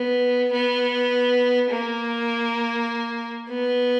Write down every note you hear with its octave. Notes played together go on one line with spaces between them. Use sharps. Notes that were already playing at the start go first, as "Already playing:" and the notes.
Already playing: B3
B3
A#3
B3